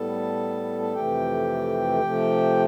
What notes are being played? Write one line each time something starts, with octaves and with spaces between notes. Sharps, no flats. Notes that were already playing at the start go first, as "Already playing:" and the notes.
Already playing: A2 G3 B3 A4 A5
A5
F2 C3 E3 A3 G4 G5
C3 F3 A3